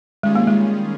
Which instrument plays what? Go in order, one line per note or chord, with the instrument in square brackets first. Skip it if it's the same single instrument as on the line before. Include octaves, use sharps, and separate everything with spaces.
[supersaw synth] D#3 G3 C#4 F4 G#4 [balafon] G#3
[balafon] A#3
G#3